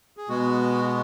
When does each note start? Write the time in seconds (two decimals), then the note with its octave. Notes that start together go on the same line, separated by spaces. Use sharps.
0.17 G#4
0.29 B2 G#3 B3 F#4